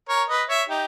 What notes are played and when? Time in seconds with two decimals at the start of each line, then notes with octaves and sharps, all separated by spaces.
0.09 A#4 C#5
0.29 B4 D#5
0.49 C#5 E5
0.69 D#4 G4